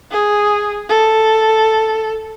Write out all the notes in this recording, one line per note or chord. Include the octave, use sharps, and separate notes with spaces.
G#4
A4